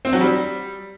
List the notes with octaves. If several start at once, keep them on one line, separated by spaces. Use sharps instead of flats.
C4
F#3
G3